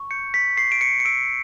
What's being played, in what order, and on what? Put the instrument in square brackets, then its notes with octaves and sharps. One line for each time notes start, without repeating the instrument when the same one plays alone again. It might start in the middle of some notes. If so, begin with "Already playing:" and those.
Already playing: [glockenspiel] C#6
G6 C#7
B6
C#6 C7
D7
C#7
C#7
E6 D7